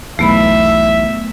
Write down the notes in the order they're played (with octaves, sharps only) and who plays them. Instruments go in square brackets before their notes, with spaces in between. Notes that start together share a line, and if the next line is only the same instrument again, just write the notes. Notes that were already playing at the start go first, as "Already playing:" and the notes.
[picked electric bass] B1 E2 [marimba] A3 B3 B5 [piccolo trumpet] E5